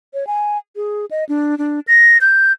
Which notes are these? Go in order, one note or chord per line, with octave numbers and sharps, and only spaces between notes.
C#5
G#5
G#4
D#5
D4
D4
A#6
G6